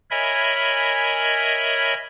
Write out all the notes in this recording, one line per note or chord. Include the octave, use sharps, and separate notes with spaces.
A#4 C#5 D#5 E5 G#5 B5